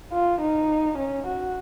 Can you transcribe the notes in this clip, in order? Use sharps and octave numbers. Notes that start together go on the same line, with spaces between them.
F4
D#4
C#4
F#4